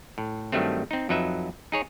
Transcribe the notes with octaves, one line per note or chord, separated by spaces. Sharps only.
A2
G2 D#3 F#3 G3 A3 C4
C4 D#4
F2 F#3 D#4 B4 E5
D#4 G#4 C#5